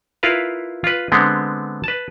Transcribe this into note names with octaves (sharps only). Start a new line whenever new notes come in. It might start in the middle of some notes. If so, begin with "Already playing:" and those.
E4 F4 A#4 B4 F5
F4 B4
D3 G#3 B3 C4
B4 A5